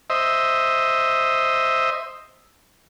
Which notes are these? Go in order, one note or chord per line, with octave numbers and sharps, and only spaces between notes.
C5 D#5 E5